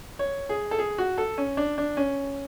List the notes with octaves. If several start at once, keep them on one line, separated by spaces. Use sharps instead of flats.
C#5
G#4
A4
G#4
F#4
A4
C#4
D4
D4
C#4